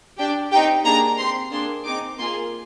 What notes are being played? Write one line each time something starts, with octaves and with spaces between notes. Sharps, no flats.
D4 G4 G5
C4 D#4 G4 G5
A#3 D4 G#4 A#5
C4 G4 C6
A#3 D4 G#4 C6
C4 D#4 G#4 D6
A#3 F4 G#4 C6